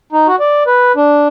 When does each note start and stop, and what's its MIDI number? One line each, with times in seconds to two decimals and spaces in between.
0.12 0.27 63
0.28 0.36 66
0.40 0.63 74
0.67 0.92 71
0.96 1.28 62